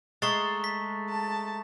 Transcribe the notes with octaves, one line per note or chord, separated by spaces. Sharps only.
G#3 A3 A#5 C#6 A6
B6
A5